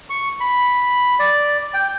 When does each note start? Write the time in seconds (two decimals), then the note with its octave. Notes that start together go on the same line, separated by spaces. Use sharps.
0.10 C#6
0.40 B5
1.19 D5
1.74 G5